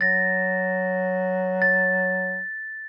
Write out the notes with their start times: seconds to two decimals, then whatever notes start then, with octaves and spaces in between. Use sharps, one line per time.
0.01 F#3 A6 A#6
1.62 A6